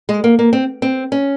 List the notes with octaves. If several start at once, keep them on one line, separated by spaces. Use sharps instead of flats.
G#3
A#3
A#3
C4
C4
C#4